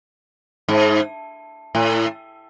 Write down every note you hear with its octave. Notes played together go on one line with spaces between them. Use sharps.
G#2
A2